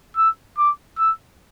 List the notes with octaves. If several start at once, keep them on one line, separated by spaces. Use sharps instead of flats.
E6
D6
E6